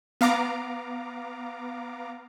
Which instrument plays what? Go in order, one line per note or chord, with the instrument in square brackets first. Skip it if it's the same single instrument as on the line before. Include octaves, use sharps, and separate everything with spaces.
[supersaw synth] B3 F5 A#5 D6